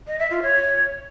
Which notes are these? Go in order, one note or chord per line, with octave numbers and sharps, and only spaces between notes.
D#5
E5
F4
C#5